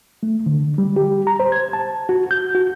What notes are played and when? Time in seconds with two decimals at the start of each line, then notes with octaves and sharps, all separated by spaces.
0.23 A3
0.46 D3
0.78 G3
0.96 G4
1.27 A#5
1.40 C5
1.52 G#6
1.73 A5
2.09 F#4
2.31 G6
2.55 F#4